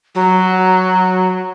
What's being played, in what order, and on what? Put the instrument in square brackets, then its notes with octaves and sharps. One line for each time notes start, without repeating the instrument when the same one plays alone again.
[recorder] F#3